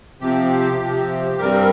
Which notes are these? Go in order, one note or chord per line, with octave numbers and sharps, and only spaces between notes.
C3 F3 C4 G4
C3 F3 C4
G2 G3 C4 A#4